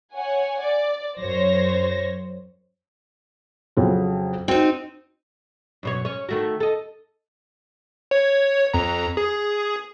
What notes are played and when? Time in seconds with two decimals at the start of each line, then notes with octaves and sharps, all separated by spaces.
0.14 C#5 F#5 G#5
0.61 D5
1.18 F#2 C5 C#5 A#6
3.77 F2 C#3 F#3
4.48 C4 D#4 F#4 G5
5.83 F#2 B2 C#5
6.05 C#4 C#5
6.29 D#3 A3 F#4
6.60 A4 D#5
8.11 C#5
8.74 F2 A#5
9.17 G#4